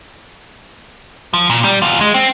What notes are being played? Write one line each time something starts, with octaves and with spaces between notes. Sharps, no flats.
F3
A#2
G3
E2 F4
G#3
C4